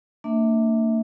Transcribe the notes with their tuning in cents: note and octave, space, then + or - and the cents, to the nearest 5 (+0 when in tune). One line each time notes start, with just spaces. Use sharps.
A#3 -45 D4 +0 E5 -30